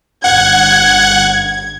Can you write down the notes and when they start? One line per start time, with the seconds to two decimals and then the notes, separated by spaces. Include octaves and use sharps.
0.24 G1 F#5 G#6